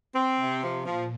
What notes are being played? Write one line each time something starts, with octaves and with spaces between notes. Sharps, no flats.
C4
C3
F3
A#2 F3